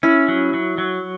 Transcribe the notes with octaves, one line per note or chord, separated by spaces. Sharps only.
C#4 E4
F#3
F#3
F#3